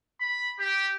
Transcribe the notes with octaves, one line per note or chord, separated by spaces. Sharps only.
B5
G4